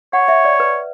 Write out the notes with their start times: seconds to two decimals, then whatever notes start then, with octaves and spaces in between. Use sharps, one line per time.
0.13 C#5 F#5
0.28 E5
0.45 D5
0.60 B4